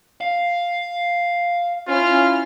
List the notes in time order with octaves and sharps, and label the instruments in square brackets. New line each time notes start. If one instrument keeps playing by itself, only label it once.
[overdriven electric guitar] F5
[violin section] C#4 E4 F6 [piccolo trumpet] F4